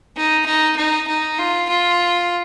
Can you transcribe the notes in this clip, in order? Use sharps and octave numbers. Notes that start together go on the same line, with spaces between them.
D#4
D#4
D#4
D#4
F4
F4